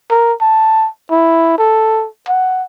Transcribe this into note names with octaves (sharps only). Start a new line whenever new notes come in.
A#4
A5
E4
A4
F#5